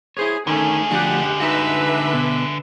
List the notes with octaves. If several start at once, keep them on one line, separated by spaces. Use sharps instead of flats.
E4 G#4 C5 C#5
D3 D#3 A3 C#4 G#4
D2 F3 D4 G4 F#5
D#4 F#4 B4 E5
B2